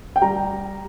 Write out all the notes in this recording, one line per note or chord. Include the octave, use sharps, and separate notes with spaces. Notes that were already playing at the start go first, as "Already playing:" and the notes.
G5
G3 A#5